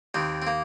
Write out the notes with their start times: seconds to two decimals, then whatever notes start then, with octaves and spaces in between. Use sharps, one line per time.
0.14 D#2 D#3 C4
0.42 C4
0.47 A#3